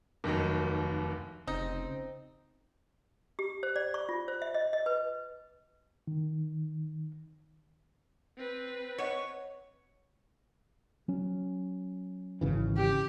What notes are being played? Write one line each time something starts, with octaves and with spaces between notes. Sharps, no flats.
F1 D#2 D#3 F#3
F1 C#3 C4 D#4
G4
C5
D5
C#6
F4
C5
E5
D#5
D#5
B4
D#3
C4 B4
C#5 D#5 F#5 C#6
F#3 C#4
G#1 C#3 E3
G4